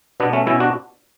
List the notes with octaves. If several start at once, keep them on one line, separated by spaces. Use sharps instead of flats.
B2 B3 D4
A3 C#4
B2 C#4 E4
D4 F#4